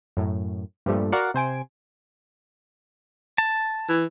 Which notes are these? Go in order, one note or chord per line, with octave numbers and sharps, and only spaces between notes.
F#2 A2
G2 A#2 F3 G3 A3
F#4 A#4 D5 F5 F#5
C3 C5 G#5 D7
A5
E3